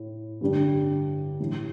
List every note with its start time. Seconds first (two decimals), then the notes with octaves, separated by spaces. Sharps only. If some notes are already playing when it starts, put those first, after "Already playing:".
Already playing: A2 A3 E4
0.41 G2 D3 G3 D4
1.40 A2 E3 G3 E4